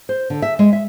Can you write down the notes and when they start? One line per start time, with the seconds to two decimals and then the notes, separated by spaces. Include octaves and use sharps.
0.09 C5
0.30 D3
0.42 E5
0.59 G#3
0.73 E5